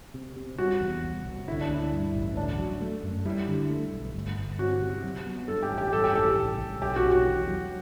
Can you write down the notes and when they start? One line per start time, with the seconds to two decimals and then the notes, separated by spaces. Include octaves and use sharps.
0.14 C3
0.36 C3
0.58 G3 F#4
0.81 E2
1.03 C2
1.26 C2
1.48 D3 E4
1.61 D4
1.69 D2 E4
1.92 G2
2.15 A1
2.37 D2 D4
2.59 F#3
2.81 A3
3.03 F#2
3.25 G3 E4
3.48 D3
3.70 A3
3.92 B1
4.14 G1
4.37 G1
4.59 C3 F#4
4.82 C3
5.04 F#3
5.26 B3
5.48 G2 A4
5.62 G4
5.71 A1
5.78 G4
5.92 G2 A4
6.04 G4
6.14 A1 A4
6.38 C2
6.59 C2
6.82 B1 G4
6.96 F#4
7.04 B1
7.11 F#4
7.27 E2
7.48 F#3